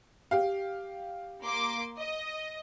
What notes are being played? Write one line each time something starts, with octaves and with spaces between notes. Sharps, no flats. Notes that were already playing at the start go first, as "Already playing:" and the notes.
G4 F5
A#3 C6 D6
D#5